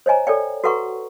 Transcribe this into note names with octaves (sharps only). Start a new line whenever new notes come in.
C5 C#5 D#5 G#5 A#5
A4 C#5 D5 G5
F#4 A4 B4 F#5 A#5 C#6